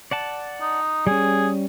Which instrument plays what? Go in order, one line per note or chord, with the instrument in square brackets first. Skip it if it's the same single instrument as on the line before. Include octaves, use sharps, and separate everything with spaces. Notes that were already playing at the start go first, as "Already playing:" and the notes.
[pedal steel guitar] D5 F#5 A5
[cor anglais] D#4
[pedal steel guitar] G3 C#4 [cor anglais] G#4